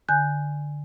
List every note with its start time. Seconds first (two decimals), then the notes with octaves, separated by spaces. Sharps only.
0.09 D3 G#5 F#6 G6